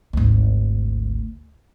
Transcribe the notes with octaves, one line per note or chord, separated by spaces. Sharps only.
G#1 D2